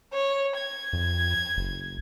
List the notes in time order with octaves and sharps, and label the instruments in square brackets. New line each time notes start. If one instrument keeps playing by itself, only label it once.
[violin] C#5
G#6
[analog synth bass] F2
F#1